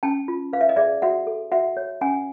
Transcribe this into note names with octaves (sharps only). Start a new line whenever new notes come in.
C#4 G5 A5
F4
B4 F5
E5
D#5
G#4 D5 E5
F#4 E5 F#5
A4
F#4 E5 F#5
C#5
C#4 F#5 G#5